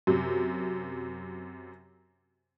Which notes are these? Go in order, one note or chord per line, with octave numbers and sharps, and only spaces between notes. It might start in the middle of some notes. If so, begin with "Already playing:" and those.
F#2 C3